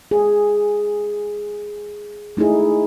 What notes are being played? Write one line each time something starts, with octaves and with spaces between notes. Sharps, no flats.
G#4
A3 D#4 E4 G#4